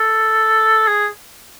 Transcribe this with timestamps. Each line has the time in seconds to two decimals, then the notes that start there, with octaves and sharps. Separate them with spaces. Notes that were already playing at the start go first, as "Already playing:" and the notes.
Already playing: A4
0.87 G#4